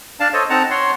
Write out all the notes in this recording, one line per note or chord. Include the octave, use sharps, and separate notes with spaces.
D4 D5 F5 A5
A4 C5 C#5 D#5
C4 D#4 F#5 A5 A#5
C#5 F#5 C6